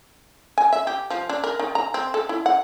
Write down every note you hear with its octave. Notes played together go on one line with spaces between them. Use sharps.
G#5
E5
G4
F3
D4
A#4
D#3
A#5
C4
A4
E4
F#5